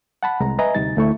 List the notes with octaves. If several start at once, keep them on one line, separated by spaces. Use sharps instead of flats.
F#5 A5 B5
C2 G#3 A#5
B4 D#5 E5 G#5 A#5
D2 C3 G3 D#4 A6
D2 A3 E4 C#6